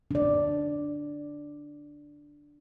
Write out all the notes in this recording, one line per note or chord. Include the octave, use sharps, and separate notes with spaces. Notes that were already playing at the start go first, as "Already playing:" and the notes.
D4 D5